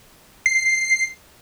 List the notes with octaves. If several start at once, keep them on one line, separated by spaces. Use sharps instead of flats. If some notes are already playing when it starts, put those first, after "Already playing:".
C7